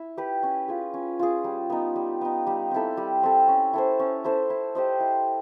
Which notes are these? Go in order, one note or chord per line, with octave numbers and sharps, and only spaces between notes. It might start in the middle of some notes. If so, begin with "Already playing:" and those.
Already playing: E4
G4 B4
C#4
F4 G#4
C#4
F4 G#4
G3
B3 D#4
G3
B3 D#4
G3
C4 E4 A4
G3
C4 E4 A4
C#4
E4 A4 C5
C#4
E4 A4 C5
E4
G4 C5 D#5
E4